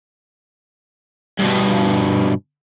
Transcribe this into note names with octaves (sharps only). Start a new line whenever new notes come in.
G2 B2